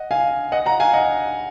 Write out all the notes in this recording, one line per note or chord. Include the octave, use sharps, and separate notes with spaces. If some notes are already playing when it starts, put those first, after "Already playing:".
Already playing: D#5 F#5
F5 G#5
D#5 F#5
F#5 A#5
F5 G#5
D#5 F#5